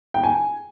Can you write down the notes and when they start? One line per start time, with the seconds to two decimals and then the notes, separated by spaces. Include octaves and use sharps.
0.14 G5
0.23 G#5